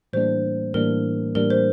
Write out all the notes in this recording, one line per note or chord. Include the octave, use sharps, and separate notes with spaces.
A2 E3 G3 A#3 D4 C5
A2 E3 G3 A#3 D4 A#4
A2 E3 G3 A#3 D4 A#4
C5